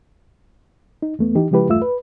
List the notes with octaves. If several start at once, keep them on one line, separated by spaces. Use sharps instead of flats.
D#4
E2 A3 B3
E3 D#4 G4
C#3 F3 G#3 E4 G4 B4
E2 G2 A3 F4 E5 E6
B4